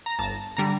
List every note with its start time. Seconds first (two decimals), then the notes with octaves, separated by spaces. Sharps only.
0.06 A#5
0.19 G1 A5
0.57 D3 G3 A#5